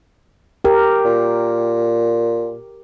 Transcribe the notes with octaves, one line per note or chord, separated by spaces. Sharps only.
G4 A#4
A#2